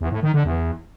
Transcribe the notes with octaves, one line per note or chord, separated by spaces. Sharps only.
E2
A2
D#3
D3
E2